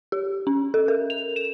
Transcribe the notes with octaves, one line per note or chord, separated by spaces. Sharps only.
G4
C#4
A4
A#4
F7
E7